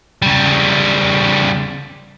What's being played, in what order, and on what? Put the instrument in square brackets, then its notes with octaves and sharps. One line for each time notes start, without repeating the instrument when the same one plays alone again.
[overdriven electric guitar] C#3 G3